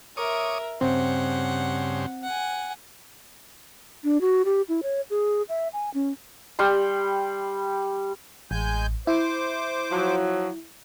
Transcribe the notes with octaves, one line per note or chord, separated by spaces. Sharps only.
A#4 C#5 E5 D6 D#6
G2 C#3 C4 C5 F#5
F#5 G#5
D4
F#4
G4
E4
C#5
G#4
E5
G#5
C#4
G3 G5 C6
A1 G#3 G#5 G6
E4 C5 D6
F3 F#3